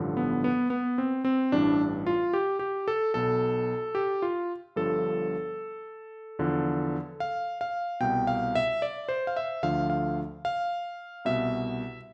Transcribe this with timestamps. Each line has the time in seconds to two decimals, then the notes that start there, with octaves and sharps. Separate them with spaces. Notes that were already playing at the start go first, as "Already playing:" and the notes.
Already playing: A1 G2 D3 F3
0.17 B3
0.44 B3
0.70 B3
0.98 C4
1.25 C4
1.52 A1 G2 E3 D4
2.07 F4
2.33 G4
2.59 G4
2.88 A4
3.14 B1 B2 A4
3.95 G4
4.22 F4
4.76 G1 G2 F3 A4
6.39 E2 D3 F3
7.20 F5
7.61 F5
8.00 C2 B2 G5
8.27 F5
8.55 E5
8.82 D5
9.09 C5
9.27 F5
9.37 E5
9.63 D2 D3 F3 F5
9.90 F5
10.45 F5
11.25 C2 B2 E5